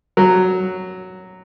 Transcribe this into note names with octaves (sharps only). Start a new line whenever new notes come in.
F#3